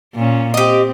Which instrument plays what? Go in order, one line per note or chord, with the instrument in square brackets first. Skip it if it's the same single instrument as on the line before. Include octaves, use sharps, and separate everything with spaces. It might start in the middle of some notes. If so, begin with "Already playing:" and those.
[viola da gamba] A#2 C#4
[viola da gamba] C4 [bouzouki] G4 D#5